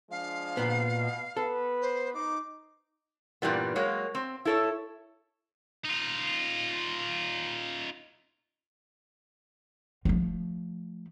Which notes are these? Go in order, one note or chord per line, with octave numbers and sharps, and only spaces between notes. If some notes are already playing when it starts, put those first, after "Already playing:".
F3 G#3 D4 F5
A#2 B3
B2
B3 A4 B4
C5
D#4 D6
G2 A#2 E3 G3 B3
F#3 G#3 A#3 C#5
C4
E4 A4 C#5
D#4 F4
F3 A3